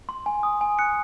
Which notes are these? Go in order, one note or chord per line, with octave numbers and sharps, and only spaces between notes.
C6
G#5
D#6
G#5
F#6 C#7